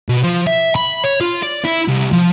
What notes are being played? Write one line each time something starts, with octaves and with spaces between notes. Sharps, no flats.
B2
F3
E5
B5
C#5
F4
D5
E4
C2
F3